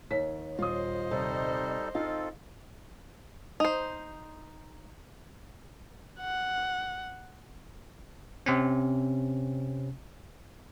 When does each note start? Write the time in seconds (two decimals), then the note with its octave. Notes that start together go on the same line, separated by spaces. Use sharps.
0.11 D#2 B6
0.59 D#1 F4 C5 C#5 D#5 D#6
1.11 C3 G3 D#4 A4
1.95 C4 D#4 F4 A4 F5
3.60 D#4 C5
6.21 F#5
8.46 C3 C4 C#4